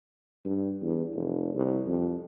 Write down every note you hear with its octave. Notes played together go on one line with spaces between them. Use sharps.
G2
E2
F1
C2
F2